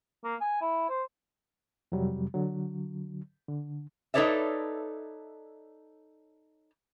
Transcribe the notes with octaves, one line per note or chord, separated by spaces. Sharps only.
A#3
G#5
E4
C5
F2 C3 F#3 G3
D3 F#3
D3
D#4 A4 B4 C#5 D5 E5